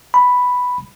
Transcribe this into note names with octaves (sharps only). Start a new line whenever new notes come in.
B5